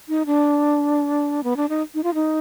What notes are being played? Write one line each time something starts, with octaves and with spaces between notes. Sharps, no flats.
D#4
D4
B3
D4
D#4
D#4
F4
D#4